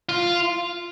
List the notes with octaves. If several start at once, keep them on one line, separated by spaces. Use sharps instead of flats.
F4